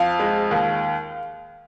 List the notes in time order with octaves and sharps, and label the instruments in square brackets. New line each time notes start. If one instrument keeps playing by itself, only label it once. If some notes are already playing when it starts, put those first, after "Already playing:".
Already playing: [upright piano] F2 F5
G#3
D#2